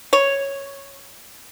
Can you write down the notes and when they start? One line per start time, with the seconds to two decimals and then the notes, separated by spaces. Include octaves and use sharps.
0.13 C#5